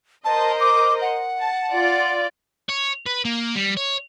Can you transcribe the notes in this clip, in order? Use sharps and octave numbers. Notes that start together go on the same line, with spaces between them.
A#4 C5 D#5 A5
D6
F#5
A5
F4 D5
C#5
B4
A#3
G3
C#5